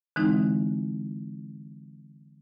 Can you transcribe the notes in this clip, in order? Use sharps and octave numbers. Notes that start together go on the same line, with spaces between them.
D3 E3 G#3 C4 D#4 E4